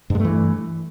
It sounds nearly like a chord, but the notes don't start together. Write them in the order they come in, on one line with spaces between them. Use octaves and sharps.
G2 G#3 A3 E3